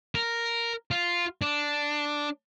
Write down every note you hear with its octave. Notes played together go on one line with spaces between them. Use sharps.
A#4
F4
D4